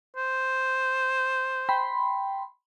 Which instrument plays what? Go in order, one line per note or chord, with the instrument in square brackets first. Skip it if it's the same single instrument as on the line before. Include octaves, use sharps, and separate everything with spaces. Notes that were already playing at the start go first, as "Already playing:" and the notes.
[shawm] C5
[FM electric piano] G5 B5 C6